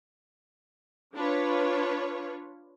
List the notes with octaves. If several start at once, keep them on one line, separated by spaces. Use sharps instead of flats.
D4 F4 B4 C#5